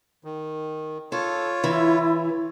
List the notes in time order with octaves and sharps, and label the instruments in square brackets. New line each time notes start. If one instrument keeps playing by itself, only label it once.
[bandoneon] D#3
[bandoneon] F4 C#5 [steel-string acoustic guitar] A4
[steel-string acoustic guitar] E3 [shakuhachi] E4